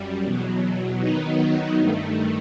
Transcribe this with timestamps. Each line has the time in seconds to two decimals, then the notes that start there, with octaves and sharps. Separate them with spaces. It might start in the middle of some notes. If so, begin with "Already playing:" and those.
Already playing: F#2 G3
0.24 E2 B2 F#3
1.00 D#3 F#3 B3 D#4
1.78 G2 D#3 A3